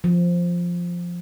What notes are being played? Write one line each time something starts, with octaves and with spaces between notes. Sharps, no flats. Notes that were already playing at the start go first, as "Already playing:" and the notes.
F3